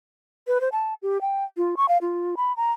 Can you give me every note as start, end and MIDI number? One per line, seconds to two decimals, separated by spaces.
0.47 0.61 71
0.61 0.69 72
0.72 0.94 81
1.02 1.21 67
1.21 1.44 79
1.57 1.75 65
1.77 1.88 85
1.89 1.98 77
2.01 2.35 65
2.37 2.55 83
2.57 2.72 82